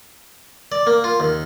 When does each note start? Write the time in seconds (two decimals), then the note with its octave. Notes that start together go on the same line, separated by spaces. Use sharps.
0.72 D5
0.87 A#3
1.04 F4
1.20 D#2